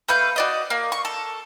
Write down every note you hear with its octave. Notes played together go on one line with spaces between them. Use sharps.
A3 B4 F5 G6
F#4 D5 D#5
A#3
C#6
A4